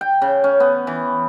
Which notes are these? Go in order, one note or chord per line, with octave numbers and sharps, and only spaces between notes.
G5
C#3
C#4
B3
E3